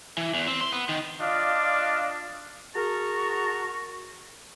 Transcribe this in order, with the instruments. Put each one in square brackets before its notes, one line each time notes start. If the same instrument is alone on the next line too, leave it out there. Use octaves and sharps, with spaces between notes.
[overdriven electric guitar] E3
E2
C4
C6
B3
D#3
[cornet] D4 [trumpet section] F4 D5 D#5 [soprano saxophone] F5
[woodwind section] F#4 G#4 A#4 A5 A#5 C#6